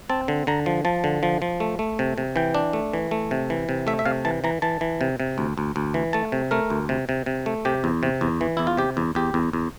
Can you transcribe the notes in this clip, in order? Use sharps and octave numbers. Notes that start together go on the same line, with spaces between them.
C4 A5
D3
D3 A#5
F3
F3 A5
D3
F3
F3
A3
A3
C3
C3
E3 G5
D4
A3
E3
A3
C3
E3
C3
A3 E5
E5
C3 F5
E3 A5
E3 A#5
E3 A5
E3
C3
C3
D2
D2
D2
E3
A3 A5
C3
A3 A#4
D2
C3
C3
C3
A3
C3 G4
E2
C3
E2
E3
E2 E4
F4
C3 G4
E2
E2 G4
E2
E2